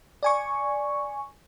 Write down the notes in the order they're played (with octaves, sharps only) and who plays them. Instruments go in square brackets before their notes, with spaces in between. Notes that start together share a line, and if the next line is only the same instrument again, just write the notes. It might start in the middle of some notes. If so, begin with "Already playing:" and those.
[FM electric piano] D5 G#5 C#6